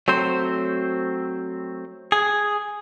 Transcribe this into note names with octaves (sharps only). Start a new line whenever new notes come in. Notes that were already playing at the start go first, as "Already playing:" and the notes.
F#3 A3 C4 C5
G#4